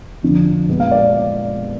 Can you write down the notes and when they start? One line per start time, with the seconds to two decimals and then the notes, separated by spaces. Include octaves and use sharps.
0.23 F2 D3 F3
0.68 A#2 G#3 B3
0.80 F5
0.92 D5